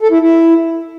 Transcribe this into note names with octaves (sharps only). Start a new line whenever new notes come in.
A4
E4
E4